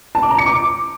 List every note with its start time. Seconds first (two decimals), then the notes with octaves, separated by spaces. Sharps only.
0.15 A5
0.23 D6
0.31 A#5
0.38 C#7
0.46 D6